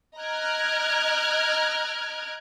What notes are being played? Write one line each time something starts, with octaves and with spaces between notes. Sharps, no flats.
D#5 A#5 F6 F#6 G#6 D7